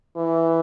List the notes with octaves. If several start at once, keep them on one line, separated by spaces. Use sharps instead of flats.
E3